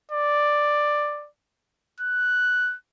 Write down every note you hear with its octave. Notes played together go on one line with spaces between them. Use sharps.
D5
F#6